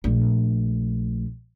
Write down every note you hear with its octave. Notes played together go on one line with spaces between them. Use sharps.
A#1 A3